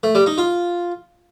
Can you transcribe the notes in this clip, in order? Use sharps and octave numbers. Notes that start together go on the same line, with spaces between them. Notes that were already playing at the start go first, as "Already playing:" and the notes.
A3
G3
D#4
F4